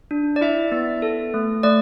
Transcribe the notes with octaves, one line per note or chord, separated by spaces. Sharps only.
D4
D5
E4 E5
B3
A4
A3
A3 D5